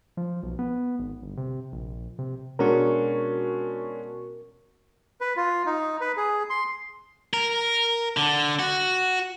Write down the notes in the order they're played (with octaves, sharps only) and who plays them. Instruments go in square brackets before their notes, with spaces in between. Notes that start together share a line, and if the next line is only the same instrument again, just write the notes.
[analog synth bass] F3
B1
B3
G#1
G1
C3
A#1
C3
[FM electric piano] B2 F#4 C#6 [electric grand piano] G#3 C#4 D4 [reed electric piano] A#4
[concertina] B4
F4
D#4
B4
G#4
C6
[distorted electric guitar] A#4
D3
F#4